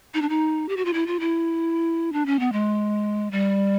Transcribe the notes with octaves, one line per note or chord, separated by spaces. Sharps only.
D#4
D4
D#4
G4
F#4
F4
E4
F4
E4
D4
C#4
B3
G#3
G3